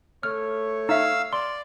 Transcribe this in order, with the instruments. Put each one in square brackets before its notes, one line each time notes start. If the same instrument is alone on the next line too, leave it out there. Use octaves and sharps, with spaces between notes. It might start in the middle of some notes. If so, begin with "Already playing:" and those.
[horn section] A3 C#5 [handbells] F6
[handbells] D#4 E5 [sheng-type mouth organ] F5 E6
[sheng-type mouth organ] D5 [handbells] C6